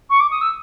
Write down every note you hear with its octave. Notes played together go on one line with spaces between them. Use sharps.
C#6
D6
D#6
E6